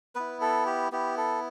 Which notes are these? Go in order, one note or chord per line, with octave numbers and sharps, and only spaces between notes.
B3 E4 B4
A4
G4
B3 E4 G4
A4